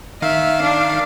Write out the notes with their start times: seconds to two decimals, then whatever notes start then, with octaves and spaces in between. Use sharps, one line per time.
0.22 D#3 E5 F5
0.62 D4